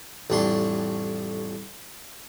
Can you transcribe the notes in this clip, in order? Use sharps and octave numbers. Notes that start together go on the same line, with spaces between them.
A1 F2 G3 D4 C6 C#6